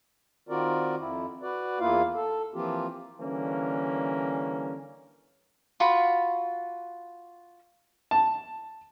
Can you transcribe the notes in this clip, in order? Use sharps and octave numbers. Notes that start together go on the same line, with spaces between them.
D#3 C4 F4 F#4 A#4 D5
F2 E4
F#4 B4 D5
E2 A#3 E4 F4 F5
A4
E3 F3 A#3 C4 F4 G4
D3 E3 G3 A#3 C#4
F4 F#4 B5
A5